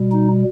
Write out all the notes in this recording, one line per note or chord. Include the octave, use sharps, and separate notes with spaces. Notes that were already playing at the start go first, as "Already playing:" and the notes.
Already playing: B2 G3
D#4